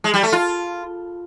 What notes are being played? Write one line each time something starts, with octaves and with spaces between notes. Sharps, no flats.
G#3
G3
A3
F4